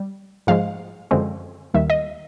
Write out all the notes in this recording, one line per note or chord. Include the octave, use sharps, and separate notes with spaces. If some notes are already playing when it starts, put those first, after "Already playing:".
Already playing: G3
G#2 F3 G#3 F5
F#2 D3 F3 G#3 C4
D#2 D#3 G3 E5
D#5